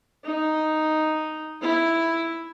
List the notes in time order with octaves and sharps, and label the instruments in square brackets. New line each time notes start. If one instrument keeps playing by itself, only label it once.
[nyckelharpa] D#4
E4